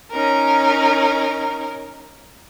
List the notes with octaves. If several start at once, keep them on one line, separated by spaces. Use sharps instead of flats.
C#4 D#4 A#4